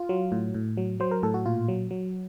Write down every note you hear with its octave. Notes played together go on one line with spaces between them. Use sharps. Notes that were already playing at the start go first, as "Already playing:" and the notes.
Already playing: F4
F#3
A2
A2
F#3
F#3 C5
A#4
A2 A4
F#4
A#2 F4
F#3
F#3